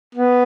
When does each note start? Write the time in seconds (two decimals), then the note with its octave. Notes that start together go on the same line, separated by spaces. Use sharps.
0.15 B3